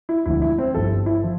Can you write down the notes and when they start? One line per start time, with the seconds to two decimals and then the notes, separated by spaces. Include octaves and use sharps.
0.09 E4
0.26 E1 D2 D3 F3 E4
0.42 E4
0.58 C4
0.74 G1 G2 F3 A4
1.06 E4
1.23 F3